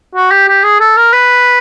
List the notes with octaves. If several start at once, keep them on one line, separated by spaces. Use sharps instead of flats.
F#4
G4
G4
G#4
A4
A#4
B4